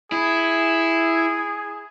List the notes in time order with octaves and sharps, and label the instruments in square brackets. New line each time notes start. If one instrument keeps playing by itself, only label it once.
[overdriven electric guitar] E4 [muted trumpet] G#4